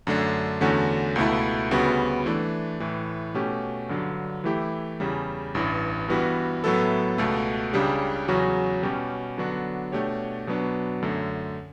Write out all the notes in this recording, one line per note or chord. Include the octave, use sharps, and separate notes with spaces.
F#2 D3 A3 D4
E2 D3 A3 C#4 F#4
C#2 B2 A3 E4
D2 C#3 G3 B3 F#4
E3 A3 D4
A2 E3 A3
B2 A3 C#4 G4
G2 D3 F#3
E3 A3 E4 G4
E2 C#3 G3
A1 G2 E3
G2 E3 G3 B3 F#4
A2 F#3 B3 E4 A4
C#2 B2 A3
C#2 C#3 G3 D4 G4
E2 C#3 F#3 C#4 F#4
B2 G3 C#4 G4
D3 F#3 B3 D4 F#4
B2 A3 D4 G4 C#5
B2 F#3 B3 D4
F#2 D3 A3